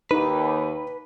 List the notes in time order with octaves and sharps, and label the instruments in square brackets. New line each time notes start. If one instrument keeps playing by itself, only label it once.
[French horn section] D#2 [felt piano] D#4 [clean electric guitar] B4